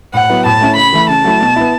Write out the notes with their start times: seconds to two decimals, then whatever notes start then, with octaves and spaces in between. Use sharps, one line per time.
0.13 A2 F#5
0.29 F#3 B3 E4
0.45 A2 A5
0.61 A3 C#4 E4
0.76 C#3 B5
0.93 E3 A3 E4
1.09 C#3 A5
1.24 F#3 A3 E4
1.41 B2
1.56 B3 E4